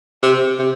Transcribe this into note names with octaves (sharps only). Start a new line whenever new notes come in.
C3
C3